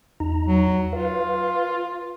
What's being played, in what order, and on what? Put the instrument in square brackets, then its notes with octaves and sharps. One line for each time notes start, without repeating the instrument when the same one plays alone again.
[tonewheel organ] E2 D#4 A#5
[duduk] F#3
[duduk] F4 [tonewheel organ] B4 F5